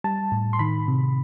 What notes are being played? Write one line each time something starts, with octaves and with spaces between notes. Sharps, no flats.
G3 A5
A2
C6
D#3 B5
C3